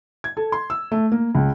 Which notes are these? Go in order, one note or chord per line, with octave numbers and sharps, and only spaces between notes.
G#6
A4
C6
E6
A3
A#3
C#2